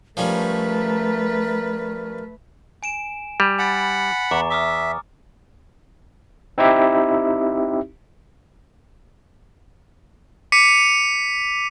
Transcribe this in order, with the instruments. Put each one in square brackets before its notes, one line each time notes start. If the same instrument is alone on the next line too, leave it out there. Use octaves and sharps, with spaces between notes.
[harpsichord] F3 G3 C#4 [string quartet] A3 B4 [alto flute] A#4
[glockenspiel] G#5 D7 E7
[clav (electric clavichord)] G3
[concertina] F#5 B5 [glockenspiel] G#5 A6 C#7
[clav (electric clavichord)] E2 [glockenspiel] A#5 C#6 D6
[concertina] E5 [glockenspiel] D6 D#6 F6
[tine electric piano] C4 D#4 E4 G4 E5
[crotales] D6 B6 C#7 D#7